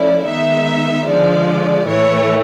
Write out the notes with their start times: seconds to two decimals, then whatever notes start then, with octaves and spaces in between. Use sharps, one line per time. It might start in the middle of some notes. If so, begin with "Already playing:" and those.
Already playing: F3 A3 C#4 E4 D5
0.26 D#3 G#3 B3 D#4 E5
1.08 D3 F3 G#3 D5
1.88 A2 E3 A3 C#5